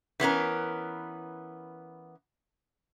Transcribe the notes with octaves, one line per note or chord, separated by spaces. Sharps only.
E3 B3 C#4 A#4